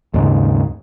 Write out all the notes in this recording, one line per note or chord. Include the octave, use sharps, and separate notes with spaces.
D#2 G#2 C#3